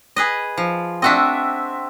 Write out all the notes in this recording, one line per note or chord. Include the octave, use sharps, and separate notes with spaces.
G#4 B4 D#5
F3
C4 D4 F#4 D#5 E5